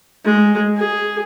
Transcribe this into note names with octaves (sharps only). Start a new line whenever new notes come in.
G#3
G#4